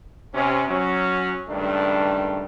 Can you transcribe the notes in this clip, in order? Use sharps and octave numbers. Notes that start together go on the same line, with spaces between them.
C3 C#4
F#3 C#4
C#2 G2 D#3 A3 D4